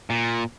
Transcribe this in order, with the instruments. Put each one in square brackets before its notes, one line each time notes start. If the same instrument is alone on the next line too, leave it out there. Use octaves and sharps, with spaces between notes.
[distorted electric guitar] A#2